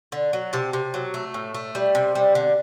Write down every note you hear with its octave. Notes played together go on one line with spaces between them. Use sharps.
D3
F#3
C3 A5
C3
F#3
A3
A2
A3
G3
C3
G3
D3